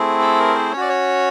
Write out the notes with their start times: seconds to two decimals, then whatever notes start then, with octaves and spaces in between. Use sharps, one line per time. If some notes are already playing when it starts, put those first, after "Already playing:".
Already playing: A3 C4 E4 G#4
0.22 A4
0.39 A#4
0.55 C5
0.72 C#4 C#5
0.77 F#4 D5
0.89 C#5